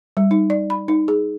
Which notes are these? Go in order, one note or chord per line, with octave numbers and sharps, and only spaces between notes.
G3
D#4
D5
B5
D#4
G#4